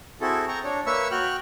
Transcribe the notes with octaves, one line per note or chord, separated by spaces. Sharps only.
C4 E4 F#4 G#4 A4
G5 A#5 C#6
D4 C#5
A#3 B4 C#5 E5 C#6 E6
F#4 G5 F6 F#6